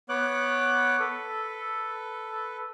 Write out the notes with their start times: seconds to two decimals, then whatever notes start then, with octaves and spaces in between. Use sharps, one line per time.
0.09 B3 C#5 D6 F#6
1.00 A4 B4